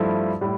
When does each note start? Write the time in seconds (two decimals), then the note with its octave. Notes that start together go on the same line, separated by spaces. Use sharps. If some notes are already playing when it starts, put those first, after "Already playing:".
Already playing: G2 F3 A3 E4
0.41 A2 G3